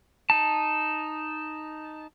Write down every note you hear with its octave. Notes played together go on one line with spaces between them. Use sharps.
D#4 A5